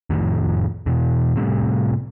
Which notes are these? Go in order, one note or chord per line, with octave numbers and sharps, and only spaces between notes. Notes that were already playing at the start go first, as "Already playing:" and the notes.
F2 A2 D#3 F3
E2 B2 E3
A2 C3 G3